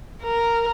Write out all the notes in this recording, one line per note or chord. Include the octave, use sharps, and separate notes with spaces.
A#4